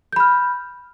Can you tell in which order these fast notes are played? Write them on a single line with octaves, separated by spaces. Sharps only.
G6 B5 F6